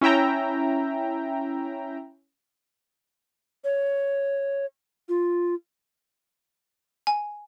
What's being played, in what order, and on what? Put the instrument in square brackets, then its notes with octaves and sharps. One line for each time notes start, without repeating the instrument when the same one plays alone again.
[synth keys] C#4 E4 E5 G5 A#5
[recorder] C#5
F4
[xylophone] G#5